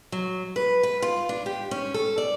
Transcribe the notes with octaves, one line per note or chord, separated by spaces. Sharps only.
F#3
B4
B4
F4
D4
G4
C#4
A4
D5